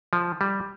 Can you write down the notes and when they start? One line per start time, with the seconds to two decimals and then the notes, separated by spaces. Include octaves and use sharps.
0.13 F3
0.41 G3